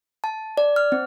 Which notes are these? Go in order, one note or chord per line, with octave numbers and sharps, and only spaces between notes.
A5
D5
F6
C4